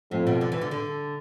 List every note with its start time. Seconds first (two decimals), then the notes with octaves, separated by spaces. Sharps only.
0.11 F2 A2
0.27 B2
0.41 D3
0.52 E3
0.61 D3
0.71 D3